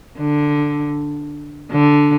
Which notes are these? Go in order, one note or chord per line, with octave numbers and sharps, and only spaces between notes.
D3
D3